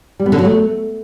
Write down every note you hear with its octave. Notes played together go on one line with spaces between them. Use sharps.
G3
B3
D3
F#3
A3